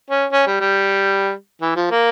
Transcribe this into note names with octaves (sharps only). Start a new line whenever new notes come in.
C#4
C#4
G3
G3
E3
F3
A#3